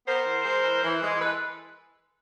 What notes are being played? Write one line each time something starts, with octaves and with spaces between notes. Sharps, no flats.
B3 A#4 C5
E3
G#3
E3
E3
G#3
E3 A4 B4